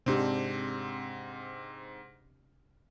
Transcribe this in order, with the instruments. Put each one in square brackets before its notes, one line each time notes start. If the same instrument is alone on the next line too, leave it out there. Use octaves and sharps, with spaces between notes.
[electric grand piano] G#2 C4 [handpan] C3 D4 G4